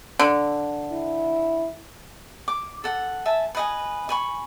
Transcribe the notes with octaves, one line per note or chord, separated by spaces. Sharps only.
D3
E4
D6
A4 F#5
E5 G#5 A5
B4 D#5 G#5
G#5 B5 C#6